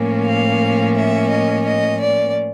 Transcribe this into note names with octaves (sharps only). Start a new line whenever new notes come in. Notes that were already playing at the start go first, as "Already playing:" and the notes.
Already playing: A2 F3 A#3 C#4
F5
E5
D#5
D#5
D5